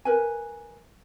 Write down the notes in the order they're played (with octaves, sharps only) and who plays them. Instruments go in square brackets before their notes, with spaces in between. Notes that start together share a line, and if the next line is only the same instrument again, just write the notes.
[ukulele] A#4 B4 G#5